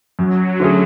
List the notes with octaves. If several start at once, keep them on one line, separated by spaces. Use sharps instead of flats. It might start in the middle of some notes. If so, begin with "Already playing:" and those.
F#2 F#3
D3 A3 C#4 G#4